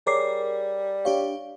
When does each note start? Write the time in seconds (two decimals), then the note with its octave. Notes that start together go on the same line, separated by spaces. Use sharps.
0.07 G3 G#4 A#4 C#5 D6 C7
1.05 D4 G4 C#5 F5